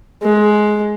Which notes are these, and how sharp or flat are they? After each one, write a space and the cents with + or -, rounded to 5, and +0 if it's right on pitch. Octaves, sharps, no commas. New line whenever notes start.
G#3 +15